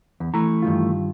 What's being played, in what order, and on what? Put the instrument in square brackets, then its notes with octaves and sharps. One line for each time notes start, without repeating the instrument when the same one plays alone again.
[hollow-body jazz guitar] E2
[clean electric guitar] E3 A3 [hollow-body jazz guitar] A#5
[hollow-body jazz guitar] G2 D#3 F4